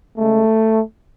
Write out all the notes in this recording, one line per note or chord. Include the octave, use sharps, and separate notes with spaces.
C#3 G#3 A3